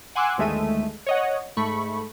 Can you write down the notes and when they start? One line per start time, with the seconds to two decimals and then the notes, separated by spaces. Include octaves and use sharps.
0.15 F#5 G#5 C6 D6 E6 F#6
0.38 G1 D#2 G#3 A3 E5 D#7
1.06 C#5 D#5 F#5
1.57 G#2 A3 B5 C#6